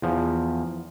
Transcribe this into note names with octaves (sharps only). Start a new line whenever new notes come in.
E2 F3